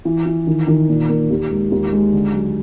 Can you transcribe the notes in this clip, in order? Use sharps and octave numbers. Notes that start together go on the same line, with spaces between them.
E3
E3
D#3
D#3
A#2
A#3
D#2
G#3
D#2
G#3
D3
F#3